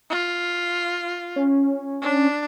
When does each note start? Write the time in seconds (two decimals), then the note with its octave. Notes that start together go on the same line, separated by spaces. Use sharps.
0.10 F4
1.36 C#4
2.02 D4